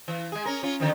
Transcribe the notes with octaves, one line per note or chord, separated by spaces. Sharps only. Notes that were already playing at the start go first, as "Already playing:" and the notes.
E3
G#3 G#4
C#4 A#4
C#4 F4
D3 D#3 F3